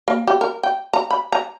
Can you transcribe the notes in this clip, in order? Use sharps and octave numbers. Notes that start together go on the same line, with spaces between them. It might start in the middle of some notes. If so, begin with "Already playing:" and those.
A#3
G4
A#4
G5
A#5
B5
A#5